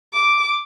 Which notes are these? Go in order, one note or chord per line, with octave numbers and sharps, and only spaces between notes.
D6